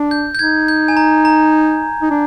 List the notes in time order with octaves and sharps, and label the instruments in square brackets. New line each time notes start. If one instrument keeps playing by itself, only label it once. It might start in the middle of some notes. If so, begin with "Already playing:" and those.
Already playing: [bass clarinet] D4
[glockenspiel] G6
G6
[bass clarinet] D#4 [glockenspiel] G#6
[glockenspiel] G6
G#5
A#5
A#5
[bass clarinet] D#4
D4